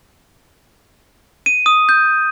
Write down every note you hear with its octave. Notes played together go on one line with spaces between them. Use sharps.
D#7
D#6
G6